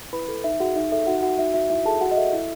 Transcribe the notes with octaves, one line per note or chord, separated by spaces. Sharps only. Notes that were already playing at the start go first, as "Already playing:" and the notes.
E4 B4 B5
A4
D#4 E5
F#4 G#4 F#5
D#4 E5
A4 E5
E5
D#4 F#4 F#5
F#4 F#5
D#4 E5
F#4 E5
E4 E5
G#4 A4 A5
F#4 F#5
D#5
A4 E5
E4